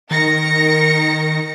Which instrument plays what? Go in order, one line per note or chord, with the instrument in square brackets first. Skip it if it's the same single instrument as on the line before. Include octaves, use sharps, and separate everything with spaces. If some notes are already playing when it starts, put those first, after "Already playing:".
[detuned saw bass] D#3 [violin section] A#4 A#6 C#7